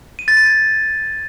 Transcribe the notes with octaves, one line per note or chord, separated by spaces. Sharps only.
D#7
A6
D#7
G#6